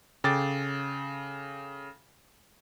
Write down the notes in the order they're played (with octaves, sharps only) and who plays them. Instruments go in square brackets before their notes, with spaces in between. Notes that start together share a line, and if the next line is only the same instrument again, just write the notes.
[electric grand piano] C#3 A4 G5 D6 A6